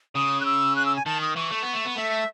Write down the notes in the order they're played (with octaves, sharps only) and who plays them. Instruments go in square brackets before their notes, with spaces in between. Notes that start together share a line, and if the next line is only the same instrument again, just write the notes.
[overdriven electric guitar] C#3 [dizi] D#6
[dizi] F#6
E6
F#6
E6
G#5
[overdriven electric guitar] D#3 [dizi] A5
[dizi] D#6
[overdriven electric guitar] E3 [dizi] C#6
[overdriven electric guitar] A3
B3
A3
B3
[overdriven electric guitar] A3 [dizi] E5